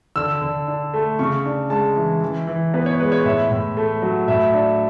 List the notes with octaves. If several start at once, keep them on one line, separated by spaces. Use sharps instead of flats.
D3 E6
D3
D4
A3
C#3 C#6
D4
G#3 A5
E3
E3
E3
B3 B4
C#5
G#3 B4
C#5
A2 E5
A2
A3
F#3
A2 E5
D4